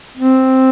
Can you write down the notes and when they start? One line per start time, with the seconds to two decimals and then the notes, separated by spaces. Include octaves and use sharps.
0.17 C4